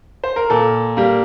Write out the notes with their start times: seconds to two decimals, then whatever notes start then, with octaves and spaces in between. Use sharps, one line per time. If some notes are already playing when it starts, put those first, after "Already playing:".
0.24 C5
0.36 A#4
0.50 A#2 A4
0.97 G3 A#3